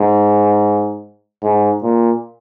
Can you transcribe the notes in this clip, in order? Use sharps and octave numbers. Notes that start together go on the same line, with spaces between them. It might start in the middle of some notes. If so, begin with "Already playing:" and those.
Already playing: G#2
G#2
A#2